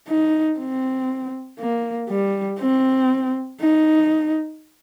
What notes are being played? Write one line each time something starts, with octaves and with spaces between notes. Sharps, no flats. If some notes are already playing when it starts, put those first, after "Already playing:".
D#4
C4
A#3
G3
C4
D#4